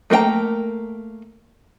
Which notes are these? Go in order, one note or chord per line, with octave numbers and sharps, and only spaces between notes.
A3 A#3 A#4 G5 A#5